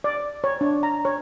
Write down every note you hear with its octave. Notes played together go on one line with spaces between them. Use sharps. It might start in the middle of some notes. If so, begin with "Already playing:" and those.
D5
C#5
D4
A#5
C#5